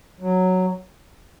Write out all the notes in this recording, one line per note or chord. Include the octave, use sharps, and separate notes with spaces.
F#3